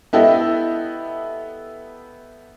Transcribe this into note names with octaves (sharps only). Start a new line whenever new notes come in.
B3 E4 G4 A4 D#5 E5